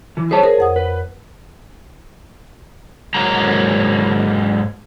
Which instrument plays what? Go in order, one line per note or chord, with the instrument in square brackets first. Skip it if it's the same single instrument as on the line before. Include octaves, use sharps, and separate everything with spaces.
[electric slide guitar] E3
[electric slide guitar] G#4 E5 A5 [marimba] C5 C#5
[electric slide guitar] G#4 [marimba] A#4
[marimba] F2 F#5 D#6
[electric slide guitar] B4
G#2 F#3 A#3 A#5